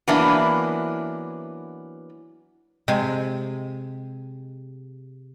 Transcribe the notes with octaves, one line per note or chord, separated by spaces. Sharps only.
E3 F#3 A#3 B3 D4 E4
C3 G#3 G#5